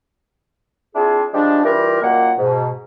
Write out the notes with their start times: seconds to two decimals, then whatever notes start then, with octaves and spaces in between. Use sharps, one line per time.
0.96 C4 D4 E4 F4 G#4
1.34 F3 G3 G#3 D4
1.64 E3 G3 E4 F4 A#4
2.02 F#2 A#2 D#3 A#3 F#5
2.38 G#2 B2